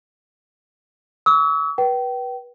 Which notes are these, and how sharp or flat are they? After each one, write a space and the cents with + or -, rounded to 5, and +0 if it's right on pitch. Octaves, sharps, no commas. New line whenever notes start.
C#6 +45 E6 -35
B4 -25 G5 -30